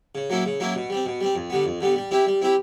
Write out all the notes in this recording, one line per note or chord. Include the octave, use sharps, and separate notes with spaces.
C#3
F#3 A#3 C#4 E4
C#3
F#3 A#3 C#4 E4
B2
G3 C4
B2
G3 C4
F2
D3 G3 B3
F2
D3 G3 B3
G3
C4 E4 G4
G3
C4 E4 G4